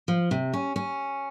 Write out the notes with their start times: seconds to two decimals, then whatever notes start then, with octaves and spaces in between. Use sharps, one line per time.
0.08 F3
0.31 C3
0.53 C#4
0.76 C#4